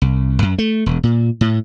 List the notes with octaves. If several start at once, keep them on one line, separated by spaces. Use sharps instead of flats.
C2
F#2
A3
E1
A#2
A2